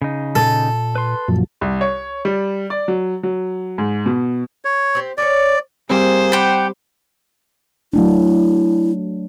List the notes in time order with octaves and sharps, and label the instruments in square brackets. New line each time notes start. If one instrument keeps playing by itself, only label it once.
[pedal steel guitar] C#3 D#4
[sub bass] A#2 [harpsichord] A4
[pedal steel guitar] B4 C6
[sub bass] F#2 [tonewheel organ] A#2 F3 F#3
[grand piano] C2
C#5
G3
D5
F#3
F#3
G#2
B2
[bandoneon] C#5
[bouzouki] C4 G4
[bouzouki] C#4 D4 C#5 [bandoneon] D5
[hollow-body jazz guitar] G3 C4 [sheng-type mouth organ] A#3 G#4 [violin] C5
[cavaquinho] G4 B5 [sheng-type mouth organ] F#5 G5
[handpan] F#3 A3 D4 [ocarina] E4